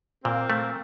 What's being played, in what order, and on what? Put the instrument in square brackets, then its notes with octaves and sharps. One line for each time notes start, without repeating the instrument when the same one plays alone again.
[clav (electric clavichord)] A#2 [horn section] A#3 C4
[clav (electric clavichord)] A3